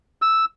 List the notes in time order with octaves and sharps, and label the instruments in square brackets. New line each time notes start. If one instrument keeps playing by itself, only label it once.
[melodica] E6